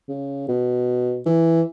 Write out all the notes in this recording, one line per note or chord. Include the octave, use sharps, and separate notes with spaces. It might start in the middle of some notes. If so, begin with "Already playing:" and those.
C#3
B2
E3